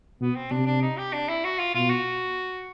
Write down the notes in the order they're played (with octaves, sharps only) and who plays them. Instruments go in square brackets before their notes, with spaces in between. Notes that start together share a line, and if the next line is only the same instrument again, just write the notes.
[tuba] B2 [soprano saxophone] B3
[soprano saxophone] C4
[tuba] C3 [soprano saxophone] D4
[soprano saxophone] D4
D#4
G4
D4
E4
F#4
F4
[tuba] B2 [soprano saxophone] F4
[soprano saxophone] F#4